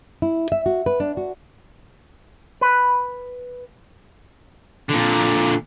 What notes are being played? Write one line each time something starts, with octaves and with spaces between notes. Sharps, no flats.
E4
E5
F#4
B4
D4
F#4
B4
A#2 D3